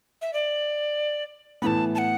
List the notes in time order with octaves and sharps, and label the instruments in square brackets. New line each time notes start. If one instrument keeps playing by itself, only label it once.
[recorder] E5
D5
[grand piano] A2 E3 B3 [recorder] A5 B5
[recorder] A5
F#5